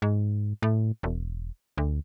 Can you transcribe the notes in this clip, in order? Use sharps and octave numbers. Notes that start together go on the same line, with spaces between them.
G#2
A2
E1
D2